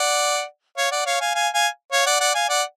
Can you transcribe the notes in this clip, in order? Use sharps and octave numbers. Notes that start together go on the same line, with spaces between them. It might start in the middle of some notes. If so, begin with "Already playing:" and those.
Already playing: D5 F#5
C#5 F5
D5 F#5
C#5 F5
F5 G#5
F5 G#5
F5 G#5
C#5 F5
D5 F#5
D5 F#5
F5 G#5
D5 F#5